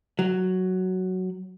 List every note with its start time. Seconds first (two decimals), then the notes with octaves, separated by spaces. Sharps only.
0.19 F#3